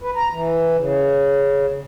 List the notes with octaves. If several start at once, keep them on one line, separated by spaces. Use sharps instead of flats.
B4
A#5
E3
C#3